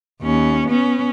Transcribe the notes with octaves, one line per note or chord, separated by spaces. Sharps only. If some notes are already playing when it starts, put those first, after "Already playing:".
D#2 C#4
B3 C#4